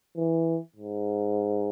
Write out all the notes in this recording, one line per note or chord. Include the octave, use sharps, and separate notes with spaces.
E3
G#2